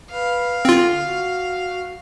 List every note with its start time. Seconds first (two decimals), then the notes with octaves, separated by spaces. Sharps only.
0.11 B4 F5
0.65 D3 C4 F4
1.03 F#4